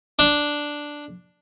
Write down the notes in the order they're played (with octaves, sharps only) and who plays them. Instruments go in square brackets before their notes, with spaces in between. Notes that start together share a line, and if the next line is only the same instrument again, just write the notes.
[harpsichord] D4